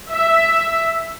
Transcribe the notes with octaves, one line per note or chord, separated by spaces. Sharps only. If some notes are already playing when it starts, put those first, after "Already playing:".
E5